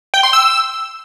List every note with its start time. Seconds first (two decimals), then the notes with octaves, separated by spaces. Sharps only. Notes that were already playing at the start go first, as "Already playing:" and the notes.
0.14 G5
0.23 C6
0.33 E6